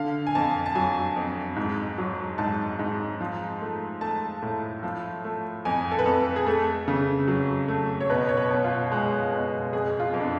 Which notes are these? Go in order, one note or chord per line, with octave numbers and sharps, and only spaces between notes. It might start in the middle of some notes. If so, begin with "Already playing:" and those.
Already playing: D3 F5
G#5
F2 A5
A5
F#3 G#5
F2
G#2
F#3
G#2 A5
G#2
F3
A3
A3 A5
A2
F3
A3
F2 G#5
A4
B4
F2 A4
G#4
A3 A4
C#3
F#3
A3
C#5
B2 B4
C#5
B4
B2
F4
G#3
B2
F2 G#4
F4
F2
D4